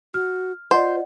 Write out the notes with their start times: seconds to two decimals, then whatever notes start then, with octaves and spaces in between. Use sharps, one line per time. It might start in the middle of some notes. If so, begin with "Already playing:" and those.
0.14 F#4 F6
0.71 F4 C5 D5 D#5 F#5